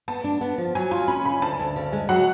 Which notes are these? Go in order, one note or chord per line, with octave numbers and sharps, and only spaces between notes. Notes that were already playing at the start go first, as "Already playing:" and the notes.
B3 A5
D4
B3
F3
F#3 G#5
F4 G#5
C#4 B5
C#3 B5
D2 A5
D2
C#3
G#3
F#3 F#5